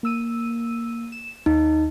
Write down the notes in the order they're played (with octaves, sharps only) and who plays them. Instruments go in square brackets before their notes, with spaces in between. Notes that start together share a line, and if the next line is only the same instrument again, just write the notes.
[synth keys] A#3 E6 D#7
E7
[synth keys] D#2 [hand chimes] D#4